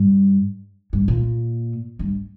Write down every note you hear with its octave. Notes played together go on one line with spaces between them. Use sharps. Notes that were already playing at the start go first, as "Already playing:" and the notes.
Already playing: G2
G2
A#2
G2